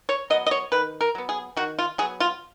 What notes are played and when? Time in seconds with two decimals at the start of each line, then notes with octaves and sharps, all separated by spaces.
0.09 C#5
0.30 F#3 D#5
0.33 B3
0.46 D#5
0.51 C#5
0.72 D#3 B4
1.01 A#4
1.15 F#3 B3
1.29 G#4
1.57 D#3 F#4
1.79 F4
1.98 F#3 G#4
2.02 B3
2.20 F4